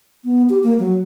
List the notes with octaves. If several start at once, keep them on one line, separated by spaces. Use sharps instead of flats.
B3
G4
A#3
F#3